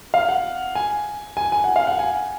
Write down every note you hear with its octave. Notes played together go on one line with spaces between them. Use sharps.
F5
F#5
G#5
G#5
G#5
F#5
F5
F#5
G#5